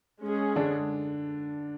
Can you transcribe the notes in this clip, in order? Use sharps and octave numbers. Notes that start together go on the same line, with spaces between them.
G#3 C#4 G#4
D3 D4